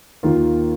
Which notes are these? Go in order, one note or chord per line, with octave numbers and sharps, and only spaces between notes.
D#2 D#3 A#3 F4